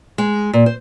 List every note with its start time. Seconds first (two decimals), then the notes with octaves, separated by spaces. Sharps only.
0.18 G#3
0.53 A#2
0.66 C5